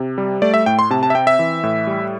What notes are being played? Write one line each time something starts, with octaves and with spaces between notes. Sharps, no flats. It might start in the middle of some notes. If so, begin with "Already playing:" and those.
Already playing: C3
G3
A3 D5
E5
A2 G5
C6
C3 A5
A5
E5
C4 G5
E5
E3
A2
G3